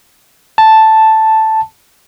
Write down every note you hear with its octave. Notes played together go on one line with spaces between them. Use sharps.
A5